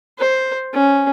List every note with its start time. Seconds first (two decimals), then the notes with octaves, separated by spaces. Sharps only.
0.19 C5
0.74 C#4